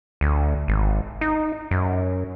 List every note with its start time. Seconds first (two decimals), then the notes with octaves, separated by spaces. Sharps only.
0.21 D2
0.68 G#1
1.21 D#4
1.71 F#2